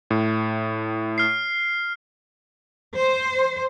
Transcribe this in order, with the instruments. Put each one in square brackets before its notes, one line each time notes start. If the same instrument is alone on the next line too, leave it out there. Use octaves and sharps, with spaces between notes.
[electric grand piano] A2
[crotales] F6 C7
[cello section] C5